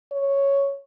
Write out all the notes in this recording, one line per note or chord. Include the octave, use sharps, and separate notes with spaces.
C#5